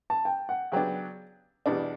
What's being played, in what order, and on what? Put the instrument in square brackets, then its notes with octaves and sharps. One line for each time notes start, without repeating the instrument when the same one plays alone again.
[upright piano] A5
G5
F#5
[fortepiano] C#3 F#3 B3 D4 [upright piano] G5
[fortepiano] E2 B2 G3 D4